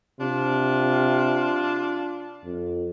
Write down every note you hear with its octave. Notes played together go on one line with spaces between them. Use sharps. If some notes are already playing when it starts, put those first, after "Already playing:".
C3 D4 F4
F2